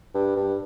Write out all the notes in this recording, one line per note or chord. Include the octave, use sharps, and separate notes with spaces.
G2
G2